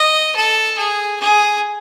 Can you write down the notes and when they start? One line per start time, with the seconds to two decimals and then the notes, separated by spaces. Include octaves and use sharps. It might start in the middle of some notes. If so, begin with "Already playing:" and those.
Already playing: D#5
0.35 A4
0.78 G#4
1.20 G#4